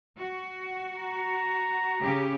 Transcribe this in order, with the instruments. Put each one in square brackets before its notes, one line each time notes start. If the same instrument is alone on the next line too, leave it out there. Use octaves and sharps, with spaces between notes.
[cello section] F#4
[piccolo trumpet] A#5
[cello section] C#3 G4